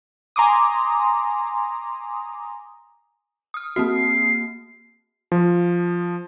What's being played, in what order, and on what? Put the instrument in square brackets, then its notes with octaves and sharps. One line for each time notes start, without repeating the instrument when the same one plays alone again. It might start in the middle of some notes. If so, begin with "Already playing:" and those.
[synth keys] G#5 A#5 C6 D6 D#6
[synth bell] D#6 F6
[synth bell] A#3 C4 F#4 [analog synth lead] C7
[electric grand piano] F3